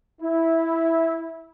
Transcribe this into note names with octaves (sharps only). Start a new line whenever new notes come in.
E4